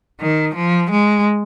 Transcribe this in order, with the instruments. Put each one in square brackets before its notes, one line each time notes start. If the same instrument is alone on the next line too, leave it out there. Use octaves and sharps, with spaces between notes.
[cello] D#3
F3
G#3